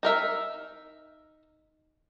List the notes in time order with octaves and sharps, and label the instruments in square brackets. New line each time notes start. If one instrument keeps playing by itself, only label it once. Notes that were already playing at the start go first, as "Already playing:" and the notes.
[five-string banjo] D#4 A#4 E5